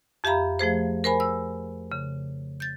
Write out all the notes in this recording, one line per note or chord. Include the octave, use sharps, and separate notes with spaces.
F2 G4 E5 F5 A#5 B5
F3 A3 G#4 C5
A#4 C5 G#5 B5
E6
C#3
G6 A6